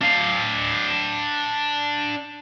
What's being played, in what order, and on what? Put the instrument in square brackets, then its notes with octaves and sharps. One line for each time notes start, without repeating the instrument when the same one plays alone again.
[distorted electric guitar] D4 F5